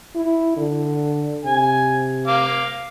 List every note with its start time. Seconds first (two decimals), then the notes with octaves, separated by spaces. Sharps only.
0.15 E4
0.57 D3
1.45 C3 G#5
2.27 F5 D6